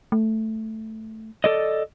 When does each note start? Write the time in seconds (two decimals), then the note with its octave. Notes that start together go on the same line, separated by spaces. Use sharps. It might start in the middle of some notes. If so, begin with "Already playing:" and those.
0.12 A3
1.44 A4 D5 D#5